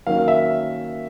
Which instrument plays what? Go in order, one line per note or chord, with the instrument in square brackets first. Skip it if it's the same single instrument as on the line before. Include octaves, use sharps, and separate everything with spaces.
[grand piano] D#3 F#3 A#3 C#4 F5
F5
E5